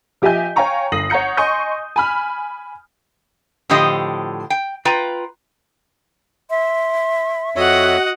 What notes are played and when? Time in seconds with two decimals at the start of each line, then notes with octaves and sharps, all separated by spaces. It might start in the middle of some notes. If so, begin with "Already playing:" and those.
0.22 F3 G4 D#5 E5 G#5 G6
0.56 C#5 F5 G5 G#5 A#5 C#6
0.92 G1 D#6 A#6 C7 F#7
1.10 C#5 F#5 A#5 G6 C#7
1.37 D#5 G#5 C6 C#6 D#6 G6
1.96 G#5 B5 F6
3.70 A2 D3 F3 G4 C5 D#5
4.50 G5
4.85 F4 B4 G5 A#5
6.50 E5 C6
7.56 F2 F#4 C#5 D#5 E5 F#5